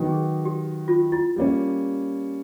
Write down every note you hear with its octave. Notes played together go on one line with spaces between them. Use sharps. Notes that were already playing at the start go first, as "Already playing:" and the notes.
Already playing: D#3 F#3 B3 D#4
G#4
G4
F4
E4
G3 A#3 C#4